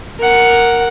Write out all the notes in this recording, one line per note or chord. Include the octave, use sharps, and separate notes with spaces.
A#4 F#5